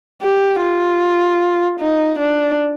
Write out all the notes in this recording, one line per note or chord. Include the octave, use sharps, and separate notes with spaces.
G4
F4
D#4
D4